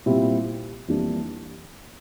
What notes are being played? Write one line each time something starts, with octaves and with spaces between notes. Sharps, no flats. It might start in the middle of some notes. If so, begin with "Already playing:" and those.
A#2 G3 C4 E4
F2 E3 G3 A#3 D4